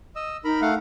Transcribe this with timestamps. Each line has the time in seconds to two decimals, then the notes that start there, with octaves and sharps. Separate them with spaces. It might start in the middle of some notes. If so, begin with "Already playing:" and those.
0.16 D#5 E6
0.44 D#4 A#4 A#5 B5
0.62 A3 F5 F#5